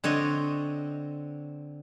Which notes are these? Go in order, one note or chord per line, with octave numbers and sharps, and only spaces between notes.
D3 C4 C#5 D#5